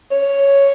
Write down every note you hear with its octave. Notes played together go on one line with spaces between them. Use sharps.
C#5